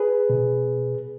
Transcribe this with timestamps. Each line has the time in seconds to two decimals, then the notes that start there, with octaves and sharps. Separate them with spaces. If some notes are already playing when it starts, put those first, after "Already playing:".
Already playing: G#4 B4
0.30 B2